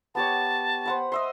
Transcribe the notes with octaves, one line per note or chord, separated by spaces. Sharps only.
B3 G4 C#5 A5
C5 F#5 B5
D#5 E5 C6